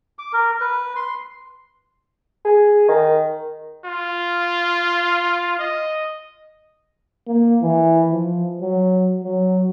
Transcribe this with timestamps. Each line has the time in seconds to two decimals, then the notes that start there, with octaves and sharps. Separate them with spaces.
0.19 D6
0.33 A#4
0.61 B4
0.96 C6
2.45 G#4
2.88 D#3
3.85 F4
5.59 D#5
7.27 A#3
7.62 E3
8.12 F3
8.61 F#3
9.24 F#3